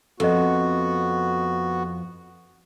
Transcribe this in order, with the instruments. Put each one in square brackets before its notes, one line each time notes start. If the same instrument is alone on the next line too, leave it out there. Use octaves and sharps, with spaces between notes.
[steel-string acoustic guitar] F2 [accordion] B3 F#4 [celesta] A4 D#5